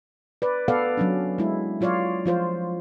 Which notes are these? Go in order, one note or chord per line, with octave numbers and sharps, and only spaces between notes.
B4 D5
B3 A4 B4 D5 F5 F#5
F#3 C#4 D4
G#3 E4
F#3 F4 C#5 D5 F5
F3 F4 C5 C#5